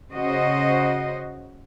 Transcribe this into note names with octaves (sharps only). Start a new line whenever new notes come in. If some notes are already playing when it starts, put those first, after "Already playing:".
C#3 F#4 C5 D#5